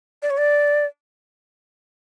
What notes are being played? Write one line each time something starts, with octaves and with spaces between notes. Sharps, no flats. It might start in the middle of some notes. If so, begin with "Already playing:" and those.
D5
C#5
D5